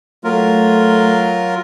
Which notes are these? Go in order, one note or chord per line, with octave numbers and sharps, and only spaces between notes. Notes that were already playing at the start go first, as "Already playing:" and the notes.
F#3 A3 F4 A#4